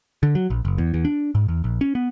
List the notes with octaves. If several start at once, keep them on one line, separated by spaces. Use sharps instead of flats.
D3
F#3
A#1
F#1
E2
E2
D4
G#2
E2
A#1
C#4
B3